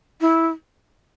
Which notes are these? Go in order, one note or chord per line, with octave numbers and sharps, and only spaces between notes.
E4